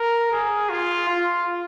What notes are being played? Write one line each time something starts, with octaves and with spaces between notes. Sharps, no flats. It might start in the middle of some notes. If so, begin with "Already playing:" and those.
Already playing: A#4
G#4
F4
F4